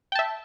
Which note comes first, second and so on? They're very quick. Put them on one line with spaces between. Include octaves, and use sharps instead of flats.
G5 A5 E5